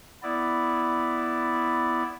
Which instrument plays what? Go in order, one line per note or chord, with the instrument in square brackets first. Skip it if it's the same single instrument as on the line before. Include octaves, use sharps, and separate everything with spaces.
[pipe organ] B3 E4 D5